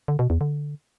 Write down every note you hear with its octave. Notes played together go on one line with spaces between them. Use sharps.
D3
B2
E2
D3